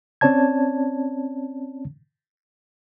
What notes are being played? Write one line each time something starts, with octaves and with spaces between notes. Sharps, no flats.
C4 C#4 C#5 D5 A5 G#6